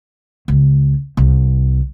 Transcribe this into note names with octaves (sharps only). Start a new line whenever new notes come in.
C#2
C2